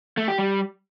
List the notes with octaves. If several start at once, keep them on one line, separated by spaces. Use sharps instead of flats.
A3
G4
G3